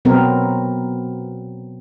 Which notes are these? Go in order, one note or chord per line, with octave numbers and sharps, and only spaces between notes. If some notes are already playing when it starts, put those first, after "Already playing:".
B2 F#3 B3 C4 A#4